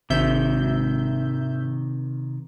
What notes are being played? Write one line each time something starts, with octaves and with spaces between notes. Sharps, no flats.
G#1 C3 D#3 E5 G6